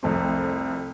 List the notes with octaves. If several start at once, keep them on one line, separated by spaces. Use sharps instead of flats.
C2 F2 A3 C4